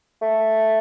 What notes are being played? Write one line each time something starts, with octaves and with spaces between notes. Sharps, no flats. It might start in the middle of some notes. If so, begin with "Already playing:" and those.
A3